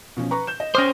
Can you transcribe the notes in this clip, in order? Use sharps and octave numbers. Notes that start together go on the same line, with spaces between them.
B2 F3 C#4
B4 A#5 C#6
G6 E7
D#5
C#4 C5 D#6 F6 A#6